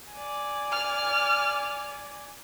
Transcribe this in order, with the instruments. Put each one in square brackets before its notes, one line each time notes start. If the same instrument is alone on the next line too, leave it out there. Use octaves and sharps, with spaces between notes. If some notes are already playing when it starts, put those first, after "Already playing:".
[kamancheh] D5 G#5
[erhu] F6